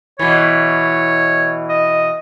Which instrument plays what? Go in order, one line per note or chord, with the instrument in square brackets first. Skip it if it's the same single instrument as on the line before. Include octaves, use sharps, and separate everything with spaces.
[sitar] B2 E3 [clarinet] C#5
[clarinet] D#5